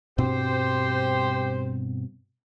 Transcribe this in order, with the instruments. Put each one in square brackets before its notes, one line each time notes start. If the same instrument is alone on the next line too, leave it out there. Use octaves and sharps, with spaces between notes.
[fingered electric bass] G2 B2 C4 [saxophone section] G4 C5